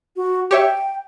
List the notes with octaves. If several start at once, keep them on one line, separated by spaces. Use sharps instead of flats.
F#4
G4 C#5 E5 G5